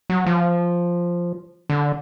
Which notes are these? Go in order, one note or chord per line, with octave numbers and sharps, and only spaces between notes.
F#3
F3
D3